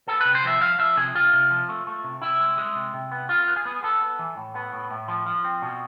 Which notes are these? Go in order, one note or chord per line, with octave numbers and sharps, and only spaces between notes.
B3 A4
C3 B4
C5
F3 E5
F3 F5
F3 E5
C3 G#4
C3 F4
C3
F3
A3
A3
C3
C3 E4
G#3
G#3
C3
C3
B3
B3 F4
B3
G#4
B3
B3 A4
B3
E3
A2
B3
A2
A2
F3
F3
C4
B2